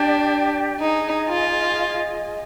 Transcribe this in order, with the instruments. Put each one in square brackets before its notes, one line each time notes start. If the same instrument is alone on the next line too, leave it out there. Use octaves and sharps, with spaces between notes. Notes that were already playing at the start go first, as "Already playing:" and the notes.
Already playing: [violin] D4 [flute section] G4 D5 G5
[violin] D#4 [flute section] G#4 D#5 G#5
[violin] F4